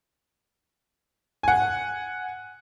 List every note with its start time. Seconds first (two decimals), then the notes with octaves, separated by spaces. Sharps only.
1.43 F#5 G#5